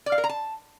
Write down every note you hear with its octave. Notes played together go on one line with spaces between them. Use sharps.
D5
F5
A#4
A#5
A5